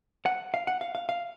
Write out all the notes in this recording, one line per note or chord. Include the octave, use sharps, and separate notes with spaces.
F#5
F5
F#5
F5
F5
F5